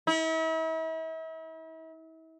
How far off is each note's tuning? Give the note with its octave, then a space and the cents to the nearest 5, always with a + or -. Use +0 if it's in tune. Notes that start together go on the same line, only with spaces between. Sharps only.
E4 -40